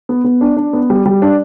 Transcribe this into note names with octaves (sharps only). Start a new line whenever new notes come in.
B3
B3
D4
D4
B3
G3
G3
D4